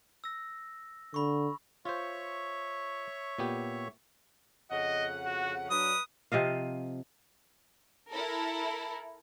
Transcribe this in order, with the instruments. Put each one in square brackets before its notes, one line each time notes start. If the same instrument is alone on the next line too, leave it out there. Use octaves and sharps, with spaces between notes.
[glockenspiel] E6 A#6
[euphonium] D3 [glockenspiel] B5 C#6
[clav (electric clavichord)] F4 C5 [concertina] C#5 E5 C#6
[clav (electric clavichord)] A#2 B3 G4
[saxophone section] F2 C#3 F#5 [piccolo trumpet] D#5
[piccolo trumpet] F#4
[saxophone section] F#3 D4 [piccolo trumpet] B4 [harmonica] D#6
[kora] C3 F3 D#5 F5
[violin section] E4 A4 A#4